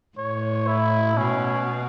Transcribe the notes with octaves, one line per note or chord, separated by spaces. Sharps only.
A2 C#5
E4
B2 C#4